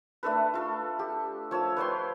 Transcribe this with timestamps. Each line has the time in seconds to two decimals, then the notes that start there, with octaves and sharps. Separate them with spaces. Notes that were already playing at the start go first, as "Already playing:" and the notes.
0.23 A3 D4 A4 B4
0.54 F4 A4
0.99 G4
1.51 F3 C#5 A5 E6
1.77 B4 C#5 G5 C6